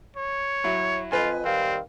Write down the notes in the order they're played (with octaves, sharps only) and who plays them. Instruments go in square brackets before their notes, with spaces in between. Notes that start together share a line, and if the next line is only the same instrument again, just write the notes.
[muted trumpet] C#5
[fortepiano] F#3 E4
[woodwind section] F2 [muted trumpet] F4 [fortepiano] B4 D#5 G#5
[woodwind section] D#3 G3 F5 [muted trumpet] C4